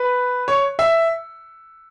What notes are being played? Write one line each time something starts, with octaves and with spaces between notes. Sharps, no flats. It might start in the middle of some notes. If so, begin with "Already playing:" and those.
Already playing: B4
C#5
E5